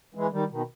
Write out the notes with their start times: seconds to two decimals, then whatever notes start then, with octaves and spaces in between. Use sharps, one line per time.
0.14 E3 G#3
0.32 D#3 G3
0.50 B2 D#3